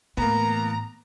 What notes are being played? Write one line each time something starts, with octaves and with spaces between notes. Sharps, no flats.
A2 E3 A#3 B3 A#5